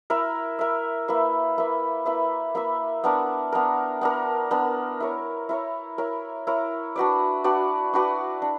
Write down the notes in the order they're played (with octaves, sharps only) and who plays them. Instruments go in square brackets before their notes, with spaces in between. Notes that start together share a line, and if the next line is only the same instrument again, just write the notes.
[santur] E4 A#4 E5
E4 A#4 E5
A#3 E4 B4 E5
A#3 E4 B4 E5
A#3 E4 B4 E5
A#3 E4 B4 E5
B3 D4 A#4
B3 D4 A#4
B3 D4 A#4
B3 D4 A#4
E4 A#4 C#5
E4 A#4 C#5
E4 A#4 C#5
E4 A#4 C#5
D4 F#4 B4 D5
D4 F#4 B4 D5
D4 F#4 B4 D5
D4